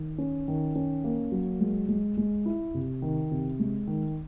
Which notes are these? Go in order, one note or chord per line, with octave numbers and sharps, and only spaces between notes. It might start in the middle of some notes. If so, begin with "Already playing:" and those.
Already playing: D#3
C#4
D#3
C#4
A#3
F#3
G#3
G#3
G#3
E4
C3
D#3
C3
G#3
D#3